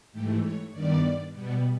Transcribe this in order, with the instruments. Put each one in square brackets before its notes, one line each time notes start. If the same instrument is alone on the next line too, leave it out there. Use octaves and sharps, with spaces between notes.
[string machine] G#2 E3 A3 G4
C#5
G2 D#3 G3 B3 D5
B2 G3 B3